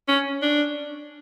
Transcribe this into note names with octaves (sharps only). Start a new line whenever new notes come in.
C#4
D4